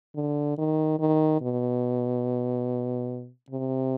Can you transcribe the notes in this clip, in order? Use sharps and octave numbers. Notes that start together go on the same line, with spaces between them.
D3
D#3
D#3
B2
C3